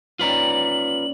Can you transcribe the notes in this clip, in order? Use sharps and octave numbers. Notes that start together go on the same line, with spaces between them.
D#2 C#4 F4 B4 D5 A#5 F#7